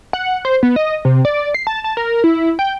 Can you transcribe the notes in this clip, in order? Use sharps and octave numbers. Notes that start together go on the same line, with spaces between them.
F#5
C5
B3
D#5
C3
D5
C7
A5
A5
A#4
E4
G5